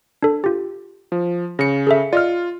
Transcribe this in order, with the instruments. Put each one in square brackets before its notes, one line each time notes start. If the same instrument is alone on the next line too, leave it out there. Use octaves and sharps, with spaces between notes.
[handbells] D4 A4
F4 G4
[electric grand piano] F3
[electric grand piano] C#3 C#7 [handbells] A#6
[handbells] G#4 A4 E5
[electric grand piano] F4 [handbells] D5 D#5 F6